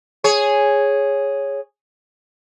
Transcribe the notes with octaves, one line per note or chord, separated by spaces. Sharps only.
G#4 C#5